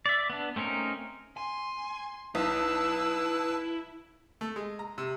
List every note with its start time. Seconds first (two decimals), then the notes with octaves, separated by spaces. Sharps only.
0.06 D5 E5
0.30 B3 D4
0.56 A3 C4 C#4 D#4 A#4
1.37 G#5 C6
2.35 B1 E4 B4 A5 E6
4.41 A3
4.56 G#3
4.79 A#5
4.98 C3